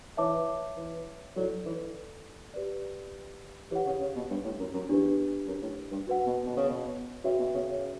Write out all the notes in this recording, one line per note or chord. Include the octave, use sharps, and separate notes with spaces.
E3 C#5 E5 A5 D6
E3
F#3 E4 A4 D5
E3
G4 B4 D5
E3 G4 C#5 F#5
C#3
C#3
B2
G2
A2
F#2
F#2
E2 D4 G4 B4
F#2
A2
G2
F#4 B4 F#5
B2
B2
C#3
B2
C#3 F#4 B4 E5 G5
B2
C#3
C#3